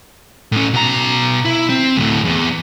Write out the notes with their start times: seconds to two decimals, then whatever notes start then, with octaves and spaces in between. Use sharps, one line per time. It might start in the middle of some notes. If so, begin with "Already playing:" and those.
0.52 A2 C#4
0.74 B2 A#5
1.45 E4
1.69 C4
1.96 D2 A2
2.25 E2